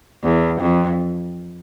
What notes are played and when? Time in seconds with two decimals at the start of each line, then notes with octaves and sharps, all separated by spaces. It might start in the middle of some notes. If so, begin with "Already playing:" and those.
0.23 E2
0.61 F2